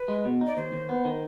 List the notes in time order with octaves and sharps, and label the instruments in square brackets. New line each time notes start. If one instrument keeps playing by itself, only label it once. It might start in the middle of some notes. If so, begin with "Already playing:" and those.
Already playing: [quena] B4
[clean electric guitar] G#3
B2
D#4
[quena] D5
[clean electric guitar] D#2 [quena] C5
[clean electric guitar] D#2
B3
D#3